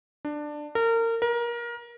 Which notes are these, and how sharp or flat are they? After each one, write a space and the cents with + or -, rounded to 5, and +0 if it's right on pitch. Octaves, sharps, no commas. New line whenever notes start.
D4 +15
A#4 -30
A#4 +25